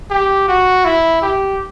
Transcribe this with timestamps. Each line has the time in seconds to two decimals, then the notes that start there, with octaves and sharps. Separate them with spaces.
0.10 G4
0.48 F#4
0.85 E4
1.22 G4